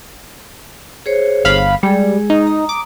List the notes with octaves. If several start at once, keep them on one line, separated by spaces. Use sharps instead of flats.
G#4 C5 C#5
G1 F5 B5
G3 G#3 G#4
D#4
A#5 D#6
D6